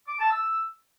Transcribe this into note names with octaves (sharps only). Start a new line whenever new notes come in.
D6
A5
E6